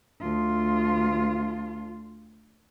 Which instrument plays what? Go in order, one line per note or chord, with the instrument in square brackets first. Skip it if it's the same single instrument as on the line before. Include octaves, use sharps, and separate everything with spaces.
[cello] D2 F4